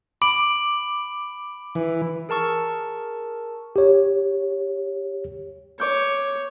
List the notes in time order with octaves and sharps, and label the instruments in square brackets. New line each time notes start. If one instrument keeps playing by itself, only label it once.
[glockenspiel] B5 D7 F#7 [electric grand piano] D6
[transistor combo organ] E3
[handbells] G#4 A#4 A5 C#6 E6
[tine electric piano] G4 C#5
[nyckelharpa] C#5 [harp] D6 G6